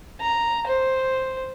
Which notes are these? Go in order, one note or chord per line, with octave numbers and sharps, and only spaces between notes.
A#5
C5